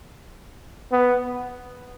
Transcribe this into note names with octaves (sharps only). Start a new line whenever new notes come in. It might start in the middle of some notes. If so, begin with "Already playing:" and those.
B3